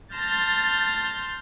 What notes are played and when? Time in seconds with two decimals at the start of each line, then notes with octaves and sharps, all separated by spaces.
0.14 A5 C6 F6 G6 A6 A#6